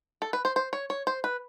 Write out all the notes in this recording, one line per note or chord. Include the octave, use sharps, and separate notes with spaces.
A4
B4
C5
C5
C#5
C#5
C5
B4